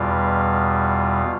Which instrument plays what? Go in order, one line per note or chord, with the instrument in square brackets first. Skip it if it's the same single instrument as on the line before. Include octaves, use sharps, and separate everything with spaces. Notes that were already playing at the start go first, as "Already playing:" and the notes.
Already playing: [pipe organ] E2 B2 G3 F4